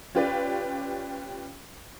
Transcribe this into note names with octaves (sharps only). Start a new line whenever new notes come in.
C#4 F4 G4 B4 D5